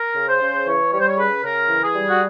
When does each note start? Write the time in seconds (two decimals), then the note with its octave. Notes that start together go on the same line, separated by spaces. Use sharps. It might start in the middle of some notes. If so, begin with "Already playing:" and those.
Already playing: A#4
0.15 C#3
0.27 C5
0.41 C#3
0.66 E3 C#5
0.92 G3 C#5
0.99 C5
1.07 C#5
1.17 C#3 B4
1.43 C#3 A#4
1.69 E3
1.82 G#4
1.95 G3
2.08 F#4